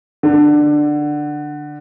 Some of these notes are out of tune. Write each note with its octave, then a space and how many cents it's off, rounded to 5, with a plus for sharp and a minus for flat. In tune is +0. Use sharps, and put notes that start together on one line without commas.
D3 +15